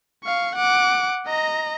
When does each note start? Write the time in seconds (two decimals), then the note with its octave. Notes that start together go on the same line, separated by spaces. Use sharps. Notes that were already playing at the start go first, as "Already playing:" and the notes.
0.24 F5 C#6
0.56 F#5 D6
1.27 D#5 A#5